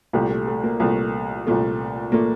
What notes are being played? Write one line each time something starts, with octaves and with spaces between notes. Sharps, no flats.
C2 A#2 A3 G4
A3
A3
A#3
C2 A#2 A3
C2 A#2 A3
A#2 A3 A#3